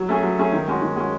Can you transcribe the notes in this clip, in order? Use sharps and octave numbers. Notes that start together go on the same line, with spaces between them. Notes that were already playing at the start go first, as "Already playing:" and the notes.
Already playing: F#3
A3 C#4 G#4
F#3
A3 C#4 G#4
D#3
G#3 C#4 F#4
D#3
G#3 C#4 F#4